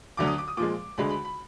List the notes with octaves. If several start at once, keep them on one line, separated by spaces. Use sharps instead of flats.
D2 D3 F#3 D6
D#6
D6
D#6
A#2 F3 G#3 D6
D2 D3 G#3 B5
B5
B5